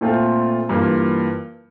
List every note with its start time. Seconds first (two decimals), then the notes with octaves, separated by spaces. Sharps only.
0.01 A#2 A3 C4 F4 A4
0.69 G2 E3 A#3 F4